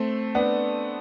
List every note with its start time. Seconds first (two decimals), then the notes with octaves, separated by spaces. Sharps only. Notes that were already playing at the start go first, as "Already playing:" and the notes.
Already playing: A3 C4
0.35 B3 D4